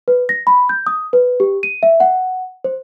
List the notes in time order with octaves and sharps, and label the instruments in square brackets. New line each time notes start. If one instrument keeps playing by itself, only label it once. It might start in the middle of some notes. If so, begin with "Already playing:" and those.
[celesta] B4
A#6
B5
G6
D#6
B4
G4
D#7
E5
F#5
C5